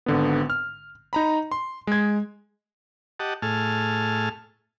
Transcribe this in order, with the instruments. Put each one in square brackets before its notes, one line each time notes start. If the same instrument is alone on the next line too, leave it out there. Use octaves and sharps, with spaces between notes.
[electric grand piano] G#1 D3 B3
F6
D#4 A#5 B5
C6
G#3 G#6
[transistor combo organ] G4 D#5 F#5 A5
A2 G#4 A5 F6